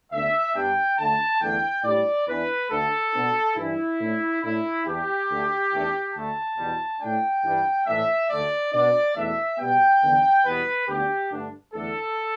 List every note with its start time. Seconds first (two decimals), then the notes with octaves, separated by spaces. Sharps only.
0.12 D2 D3 B3 D4 E5
0.55 G2 G3 B3 D4 G5
0.98 D2 D3 A3 A5
1.41 E2 D3 A3 D4 G5
1.84 A2 G3 D4 D5
2.27 E2 E3 B3 D4 B4
2.70 D2 D3 A3 A4
3.14 B2 B3 D4
3.56 G2 E3 G3 D4 E4
3.99 A2 A3 D4
4.42 A2 A3 D4 E4
4.86 E2 E3 B3 D4 G4
5.29 D2 D3 A3
5.72 E2 E3 A3 D4
6.14 D2 D3 A3 A5
6.57 E2 B2 G3
7.00 A2 A3 D4 G5
7.44 G2 E3 G3 D4
7.87 A2 E3 A3 D4 E5
8.29 D2 D3 A3 D5
8.73 B2 B3 D4 D5
9.16 E2 B2 A3 D4 E5
9.58 B2 G3 B3 G5
10.02 E2 D3 B3 D4
10.45 E2 B2 G3 B3 B4
10.88 D2 D3 B3 D4 G4
11.31 G2 D3 A3 D4
11.74 E2 D3 A3 D4 A4